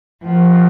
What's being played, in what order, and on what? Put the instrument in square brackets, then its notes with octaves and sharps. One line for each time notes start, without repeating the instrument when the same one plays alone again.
[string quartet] F3 [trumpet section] C4 F#4 A#4 D#5 F#5